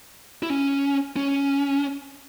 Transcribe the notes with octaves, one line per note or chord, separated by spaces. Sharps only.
E4
C#4
C#4